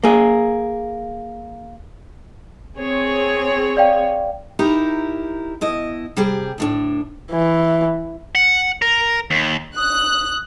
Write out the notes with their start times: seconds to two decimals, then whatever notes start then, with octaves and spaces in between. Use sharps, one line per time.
0.04 A#3 G#4
2.76 C4 G#4 C#5
3.77 D5 F5 G5
4.59 D#4 E4 G4 A#4
5.61 B2 E4 D#5
6.16 C3 G3 G4 G#4
6.58 D2 A2 D4
7.32 E3
8.35 F#5
8.82 A#4
9.30 D#2
9.77 D#6 F#6